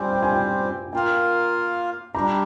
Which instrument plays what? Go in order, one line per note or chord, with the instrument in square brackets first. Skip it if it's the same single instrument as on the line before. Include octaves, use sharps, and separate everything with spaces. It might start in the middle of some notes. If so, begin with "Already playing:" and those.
Already playing: [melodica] G3 C4 G4 C5 [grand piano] G#5
[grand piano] G5
G#5
G5
[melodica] A#3 F4 A#4 F5 [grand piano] G5
[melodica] G3 D4 G4 [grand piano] A#5